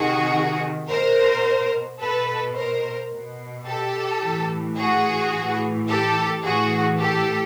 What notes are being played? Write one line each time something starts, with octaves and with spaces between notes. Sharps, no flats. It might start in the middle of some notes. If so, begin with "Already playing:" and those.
Already playing: C3 D#3 F#4 G#4
B2 A#4 C5
B2 A4 B4
A#4 C5
B2
G4 A4
A2 E3
F#4 G#4
A2 E3
G4 A4
A2 E3 F#4 G#4
G4 A4